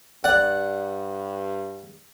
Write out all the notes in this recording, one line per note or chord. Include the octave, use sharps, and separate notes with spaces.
G2 D5 F#5